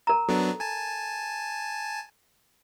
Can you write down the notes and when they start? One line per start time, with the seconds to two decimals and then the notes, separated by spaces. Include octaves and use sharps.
0.07 A#4 A#5
0.29 F#3 B3 D4 A4
0.60 G#5 A5